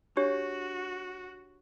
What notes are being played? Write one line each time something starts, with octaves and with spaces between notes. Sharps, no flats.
D4 F#4 G4 C#5